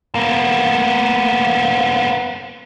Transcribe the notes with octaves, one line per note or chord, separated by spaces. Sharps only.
A#3 B3